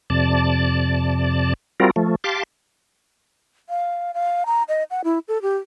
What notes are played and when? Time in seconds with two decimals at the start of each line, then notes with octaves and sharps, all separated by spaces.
0.10 F2 C3 D5 A5
1.80 G3 C4 F4 F#4 A#4
1.96 F3 A3
2.24 G4 F5 A5 C6 D6
3.69 F5
4.14 F5
4.46 A#5
4.69 D#5
4.91 F#5
5.04 E4
5.28 A4
5.42 G4